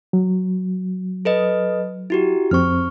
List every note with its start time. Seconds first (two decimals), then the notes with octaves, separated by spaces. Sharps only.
0.13 F#3
1.25 A4 B4 D#5
2.10 E4 F#4 G4
2.51 F2 C4 C#6 F6